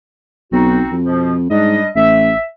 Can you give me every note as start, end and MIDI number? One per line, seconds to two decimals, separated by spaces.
0.52 0.81 35
0.52 0.94 60
0.52 0.94 63
0.52 0.94 66
0.91 1.47 41
1.05 1.34 47
1.05 1.34 53
1.50 1.78 44
1.50 1.86 55
1.50 1.86 62
1.50 1.86 75
1.96 2.33 33
1.96 2.44 76